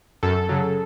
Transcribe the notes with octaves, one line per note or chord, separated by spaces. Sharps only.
F#2 A4
C#3 F#3